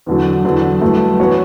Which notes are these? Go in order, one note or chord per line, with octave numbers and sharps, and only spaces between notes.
E2 D3 F#3
E2 D3 F#3
G2 F#3 A3 E4
E3 B3 F#4 C#5